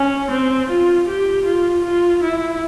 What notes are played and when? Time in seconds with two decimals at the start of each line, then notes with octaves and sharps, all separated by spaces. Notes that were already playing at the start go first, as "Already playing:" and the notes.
Already playing: C#4
0.31 C4
0.69 F4
1.08 G4
1.45 F4
1.85 F4
2.23 E4